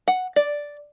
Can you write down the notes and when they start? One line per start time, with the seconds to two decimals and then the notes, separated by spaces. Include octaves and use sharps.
0.08 F#5
0.36 D5